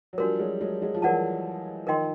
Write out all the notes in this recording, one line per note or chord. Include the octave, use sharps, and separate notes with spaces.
F#3
F3 G3 D4 F#4 A#4
F#3 G#3
F#3 G#3
F#3 G#3
F3
E3 F#3 A#4 D5 F#5 A5
D#3 F3 A#4 D#5 G5 C6